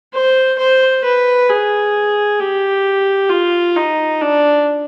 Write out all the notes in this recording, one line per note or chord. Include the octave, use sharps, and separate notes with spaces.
C5
C5
B4
G#4
G4
F4
D#4
D4